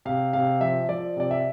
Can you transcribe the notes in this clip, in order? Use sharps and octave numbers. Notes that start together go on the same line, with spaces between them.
C3 F5
C3 F5
F3 E5
F3 D5
C3 D5
E5